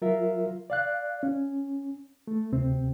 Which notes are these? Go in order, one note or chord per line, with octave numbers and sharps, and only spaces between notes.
F#3 F4 A#4 E5
D5 F5 F#6
C#4
A3
D2 C3 C4